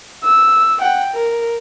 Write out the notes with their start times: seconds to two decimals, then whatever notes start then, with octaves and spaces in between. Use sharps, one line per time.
0.24 E6
0.80 F#5 G5
1.14 A#4